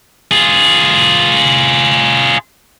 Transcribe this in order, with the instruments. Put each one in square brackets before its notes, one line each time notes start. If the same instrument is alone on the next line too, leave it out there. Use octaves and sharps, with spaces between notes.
[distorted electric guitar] F4 G#4